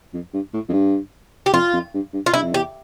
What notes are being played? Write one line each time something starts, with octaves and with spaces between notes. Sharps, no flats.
F2
G2
A2
F2
G2
G4
F2 F4
F2
G2
G2
F4
G2 E4
F2
E2 G4